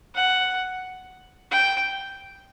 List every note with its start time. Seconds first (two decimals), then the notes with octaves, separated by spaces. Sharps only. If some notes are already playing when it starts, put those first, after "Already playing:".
0.15 F#5
1.51 G5